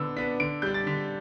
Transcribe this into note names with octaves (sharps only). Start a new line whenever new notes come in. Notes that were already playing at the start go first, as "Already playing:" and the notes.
Already playing: D3 B3 D4 E6
B3 D4 B6
D3 D7
G3 D4 G6
A6
D3 B6